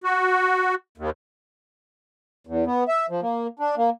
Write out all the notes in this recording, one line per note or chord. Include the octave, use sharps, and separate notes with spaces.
F#4
D#2
E2
B3
E5
F3
A#3
D4
A#3